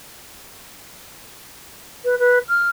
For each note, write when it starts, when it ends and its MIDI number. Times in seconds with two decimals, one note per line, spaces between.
2.04 2.18 71
2.19 2.38 71
2.48 2.68 89